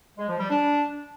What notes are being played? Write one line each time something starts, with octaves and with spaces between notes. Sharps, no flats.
G#3
F3
G3
D4